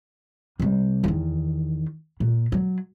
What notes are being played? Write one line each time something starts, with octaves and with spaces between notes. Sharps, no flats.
C3 G3
E2 D#3
A#2
F#3